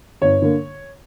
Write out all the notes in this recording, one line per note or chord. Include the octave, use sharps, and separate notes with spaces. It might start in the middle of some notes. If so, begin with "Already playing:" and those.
G1 C#5
D3 A#3